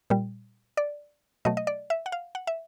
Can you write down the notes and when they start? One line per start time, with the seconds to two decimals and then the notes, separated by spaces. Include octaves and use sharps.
0.10 A#2 G3
0.77 D5
1.45 B2 F#3 A3 D#5
1.57 D#5
1.67 D5
1.90 E5
2.06 F#5
2.12 F5
2.35 F#5
2.47 E5